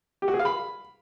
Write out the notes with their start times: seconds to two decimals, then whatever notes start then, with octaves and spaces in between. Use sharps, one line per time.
0.22 G4
0.28 F#4
0.34 G#4
0.39 F5
0.45 B5